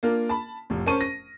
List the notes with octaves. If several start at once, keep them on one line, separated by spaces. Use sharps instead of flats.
A#3 D4 F4 A#4
A5 B5
F1 A2
C#4 A#4 C5 A5 C#6 D#7
A#6